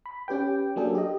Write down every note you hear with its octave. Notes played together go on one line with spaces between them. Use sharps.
B5
C#4 G4 B4 G5
F#3 A#3 D4 G#4 A4
G4 D#5